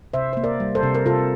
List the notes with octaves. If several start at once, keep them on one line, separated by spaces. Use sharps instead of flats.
C3 C5 E5
A#3 C5
A#4 D5
G3
A4 C5
C3
A#4
C3 F4 A4